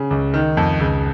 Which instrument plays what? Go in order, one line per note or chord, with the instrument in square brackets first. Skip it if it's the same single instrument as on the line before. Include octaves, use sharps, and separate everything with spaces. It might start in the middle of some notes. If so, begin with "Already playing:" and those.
Already playing: [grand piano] C#3
C#2
D#3
F2
C#2